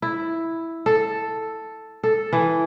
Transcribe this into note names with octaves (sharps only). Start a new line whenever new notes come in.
E4
A4
A4
E3